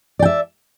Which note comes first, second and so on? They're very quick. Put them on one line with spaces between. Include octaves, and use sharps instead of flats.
D5 G5 E5